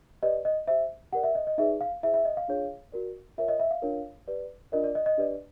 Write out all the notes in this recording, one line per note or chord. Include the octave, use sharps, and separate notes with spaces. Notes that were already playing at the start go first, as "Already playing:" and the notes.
G4 B4 D5 D#5
D#5
G4 C5 E5
G4 A#4 D5 F#5
E5
D#5
D#5
D#4 G#4 B4 D5 E5
F5
E4 G#4 C5 E5
E5
D#5
F5
D4 F4 G#4 C#5
F#4 A#4 D5
F4 A#4 C#5 E5
D#5
E5
F5
D4 F4 A#4 C#5
G4 B4 D5
D4 F4 A#4 D5 D#5
D5
D#5
D#5
D4 G4 B4 D5